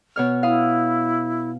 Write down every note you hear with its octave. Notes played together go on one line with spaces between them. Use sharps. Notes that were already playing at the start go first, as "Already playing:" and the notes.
B2 C#5 F6
E4 F5 B5 D#6